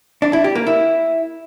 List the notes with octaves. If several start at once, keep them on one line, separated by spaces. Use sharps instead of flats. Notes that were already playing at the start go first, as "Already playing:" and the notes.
D4
E4
G4
A#3
E4